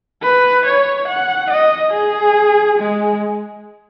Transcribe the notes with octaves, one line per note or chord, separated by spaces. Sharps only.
B4
C#5
F#5
D#5
G#4
G#3